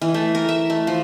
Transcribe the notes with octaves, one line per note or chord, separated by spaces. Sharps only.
E3
A3
A#4
E5
A3
F3